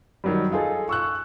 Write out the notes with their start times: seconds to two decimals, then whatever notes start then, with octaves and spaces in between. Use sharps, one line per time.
0.24 D#3 F#3 G3
0.51 D#4 F4 G#4 A4
0.89 C#6 E6 F#6